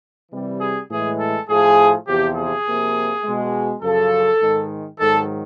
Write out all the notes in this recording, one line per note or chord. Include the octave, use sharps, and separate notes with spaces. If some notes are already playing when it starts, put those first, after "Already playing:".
C3 E3 G3
G#4
A2 E3 G#3 G#4
A4
A2 F3 A3 G#4
E2 C3 F3 G4
G#4
C3 F3 A#3
B2 G#3
F#2 C#3 F3 A4
G#2 D#3 G#3
G#2 D#3 F#3 A4